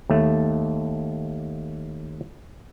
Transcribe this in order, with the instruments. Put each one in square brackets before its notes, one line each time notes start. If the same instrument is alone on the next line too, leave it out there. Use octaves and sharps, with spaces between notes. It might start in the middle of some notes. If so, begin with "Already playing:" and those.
[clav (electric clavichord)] D#2 A3